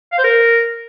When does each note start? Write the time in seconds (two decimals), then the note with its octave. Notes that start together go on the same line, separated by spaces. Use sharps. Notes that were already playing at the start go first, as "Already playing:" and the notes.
0.12 F5
0.18 C5
0.24 A#4